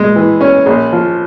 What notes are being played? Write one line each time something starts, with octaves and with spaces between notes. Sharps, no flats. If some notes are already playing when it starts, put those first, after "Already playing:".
Already playing: G#3
E3
C#4
A#1
F3